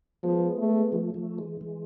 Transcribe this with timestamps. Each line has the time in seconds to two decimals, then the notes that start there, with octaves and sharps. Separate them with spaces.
0.23 F3 G#3 B3
0.58 A3
0.92 F3 A3
1.14 F3 A3
1.38 E3 G#3
1.61 E3 G#3